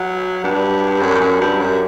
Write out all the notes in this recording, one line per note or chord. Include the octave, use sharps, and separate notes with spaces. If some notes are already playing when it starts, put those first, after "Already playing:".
Already playing: F#3
G2
F#2
F#2
G2
F#2